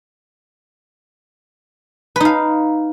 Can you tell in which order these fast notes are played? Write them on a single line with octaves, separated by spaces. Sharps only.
B4 D#4 F5